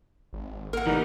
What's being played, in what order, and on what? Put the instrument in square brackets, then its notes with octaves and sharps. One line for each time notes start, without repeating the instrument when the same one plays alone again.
[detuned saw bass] G#1
[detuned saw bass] A#3 [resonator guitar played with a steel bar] A#4 F#5
[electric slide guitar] E3 G3 [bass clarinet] D#4